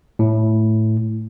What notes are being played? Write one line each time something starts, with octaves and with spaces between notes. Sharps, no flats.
A2